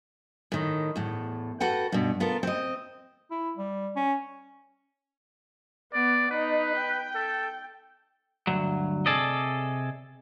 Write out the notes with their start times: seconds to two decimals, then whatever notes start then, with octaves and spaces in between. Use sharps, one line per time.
0.52 A2 D#3
0.96 E2 A2
1.60 F#4 A4 B4 F#5 G5
1.92 G2 B2
2.20 B3 F4 A4 A#4
2.43 C4 D#5
3.31 E4
3.57 G3
3.96 C#4
5.93 B3 D5
6.31 D#4 B4
6.76 G5
7.15 A4
8.47 D2 G2 F#3
9.06 C3 G#4 A4 D5 D#5